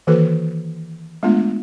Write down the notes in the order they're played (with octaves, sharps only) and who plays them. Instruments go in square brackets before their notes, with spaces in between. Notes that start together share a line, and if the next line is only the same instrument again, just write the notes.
[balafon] D#3 E3 A#3 F#4 A4 B4
G#3 A3 B3 D4 F4